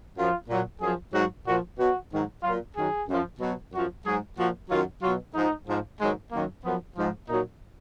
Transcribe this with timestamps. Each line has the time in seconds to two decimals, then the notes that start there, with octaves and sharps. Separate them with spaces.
0.15 F#2 F3 F4
0.48 A#2 F#3
0.80 F#2 F3 G#4
1.12 G#2 F#3 F#4
1.45 A#2 F3 F#4
1.77 B2 F#3 F#4
2.11 G#2 D#3 F#3
2.42 A#2 F#3 F4
2.74 F#2 D#3 F#3 G#4
3.07 F#2 F3
3.39 B2 F#3
3.72 F#2 F3 F#4
4.04 G#2 F#3 G#4
4.37 A#2 F3 F#4
4.69 F#2 D#3 F#3 F4
5.01 B2 F#3 F4
5.34 G#2 F3 D#4
5.67 G#2 F3
5.99 G#2 D#3 F#3 G#3
6.32 F#2 D#3 F#3 A#3
6.64 F#2 F3 B3
6.96 G#2 F3
7.28 A#2 F#3 D#4